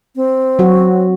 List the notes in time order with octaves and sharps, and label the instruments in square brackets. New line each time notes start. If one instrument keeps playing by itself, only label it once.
[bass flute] C4
[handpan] F#3 F#4